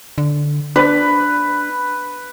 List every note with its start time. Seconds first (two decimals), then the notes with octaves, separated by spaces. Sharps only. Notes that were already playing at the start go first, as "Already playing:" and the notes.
0.18 D3
0.76 D4 B4